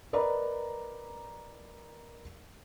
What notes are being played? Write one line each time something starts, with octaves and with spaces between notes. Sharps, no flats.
A#4 B4 D5 D#5 A#5 B5